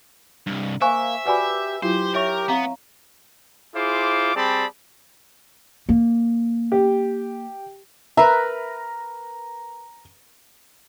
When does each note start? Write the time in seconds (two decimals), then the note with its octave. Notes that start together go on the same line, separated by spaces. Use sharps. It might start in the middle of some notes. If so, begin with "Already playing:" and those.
0.47 C2 G2
0.82 A#3 C5 E5 F5 G#5 C#6
1.26 F#4 G4 B4 D5 F#5 G#5 B5
1.83 F#3 E4 F4 G4 C5
2.14 A#4 C#5 E5 C#6
2.49 B3 C4 F5 A#5
3.75 E4 F4 G#4 C5 D6
4.36 G3 C4 G#4 D5 A5 B5
5.89 A#3
6.72 G4
8.17 A#4 B4 E5 A#5